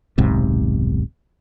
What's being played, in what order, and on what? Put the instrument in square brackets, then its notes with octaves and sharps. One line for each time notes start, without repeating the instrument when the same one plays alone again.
[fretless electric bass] D#1 B1 G#2 C3